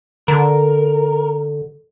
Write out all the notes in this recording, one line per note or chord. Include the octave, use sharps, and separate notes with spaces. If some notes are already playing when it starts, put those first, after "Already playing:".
D3 A#4